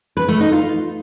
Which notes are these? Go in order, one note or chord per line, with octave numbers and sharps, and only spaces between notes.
B4
A3
D#4
F4